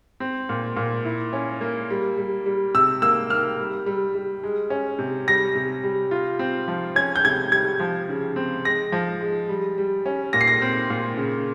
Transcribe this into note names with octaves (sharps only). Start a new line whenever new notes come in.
C4
A#2
A#2
E4
C#4
A#3
G3
G3
G3
C3 E6
A#3 E6
A#3 F6
G3
G3
G3
G#3
C#4
C3
G3 A#6
C3
G3
F4
C4
F3
C#4 G#6
G6
C3 G#6
G3 G#6
F3
C#3
C4
G#3 A#6
F3
G#3
G3
G3
C#4
A#2 A#6
C7
A#6
C4
A#2
C#3